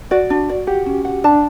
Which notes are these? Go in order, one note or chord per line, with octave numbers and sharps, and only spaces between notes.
F#4 D5
D4
D5
G4 F#5
C#4
F#5
D4 A5